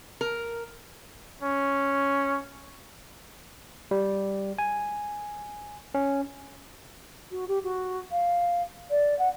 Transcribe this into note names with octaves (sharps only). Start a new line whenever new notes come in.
A#4
C#4
G3
G#5
C#4
F#4
G4
F#4
F5
D5
F#5